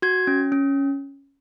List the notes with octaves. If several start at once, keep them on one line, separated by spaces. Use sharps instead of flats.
F#4 G#6
C#4
C#4